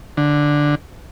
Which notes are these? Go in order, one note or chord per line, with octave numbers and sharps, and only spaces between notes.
D3